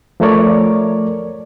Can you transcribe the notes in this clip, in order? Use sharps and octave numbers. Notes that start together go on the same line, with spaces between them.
F3 A3 A#4 C#5 D5